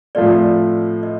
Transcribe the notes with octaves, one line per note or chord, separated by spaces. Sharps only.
A2 F3 A3 C4 F4 D5
D#5